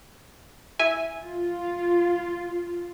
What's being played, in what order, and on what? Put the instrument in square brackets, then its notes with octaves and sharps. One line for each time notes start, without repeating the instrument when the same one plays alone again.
[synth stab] E4 E5 G#5
[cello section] F4